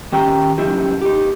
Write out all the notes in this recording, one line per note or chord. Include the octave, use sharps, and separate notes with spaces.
D#3 C#4 G4 G5 A#5
C#3 F#3 C#4 D#4 E4 G4
D#4 G4